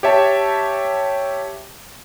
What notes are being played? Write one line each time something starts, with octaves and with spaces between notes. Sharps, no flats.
G4 C#5 E5 A5